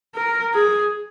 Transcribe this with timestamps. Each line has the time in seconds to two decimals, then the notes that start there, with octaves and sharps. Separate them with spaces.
0.15 A#4
0.54 G#4